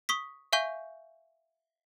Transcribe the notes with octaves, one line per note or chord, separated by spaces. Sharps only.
C#6 D#6 B6
E5 F5 G#5 C#6 G6